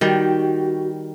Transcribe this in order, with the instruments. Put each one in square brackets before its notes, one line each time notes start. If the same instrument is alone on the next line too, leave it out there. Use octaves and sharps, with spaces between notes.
[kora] D#3 G3 [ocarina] F#4